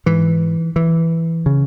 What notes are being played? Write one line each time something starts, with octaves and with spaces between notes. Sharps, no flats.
G#2 E3
E3
C#3